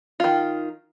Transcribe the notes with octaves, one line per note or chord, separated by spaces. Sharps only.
D#3 F4